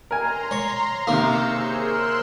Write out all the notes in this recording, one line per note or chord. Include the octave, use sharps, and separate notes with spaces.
A#4 G#5 A#5 C6
C#5
C3 D#3 A#3 F5 E6 G6 C#7
G#4 C5 C#5
A#4 C6 E6 F#6